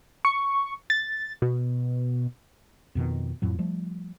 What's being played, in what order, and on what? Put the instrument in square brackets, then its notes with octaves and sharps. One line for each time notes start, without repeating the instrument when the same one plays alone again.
[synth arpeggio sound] C#6
A6
B2
[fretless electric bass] F2 B2 D#3
F2 A2 F#3
F3 G3 A3